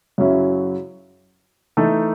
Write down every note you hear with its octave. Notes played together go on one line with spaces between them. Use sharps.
F#2 C#3 F#3 C#4 E4
E3 A3 D#4 A4